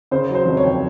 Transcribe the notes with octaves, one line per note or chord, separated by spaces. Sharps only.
C#3 C5
F#3
C5
F1
C#5
D#2